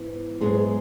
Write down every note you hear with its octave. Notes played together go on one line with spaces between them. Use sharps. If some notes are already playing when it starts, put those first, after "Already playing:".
Already playing: G#2 E3 B3
G#2 F#3 G#3 B3 E4 G#4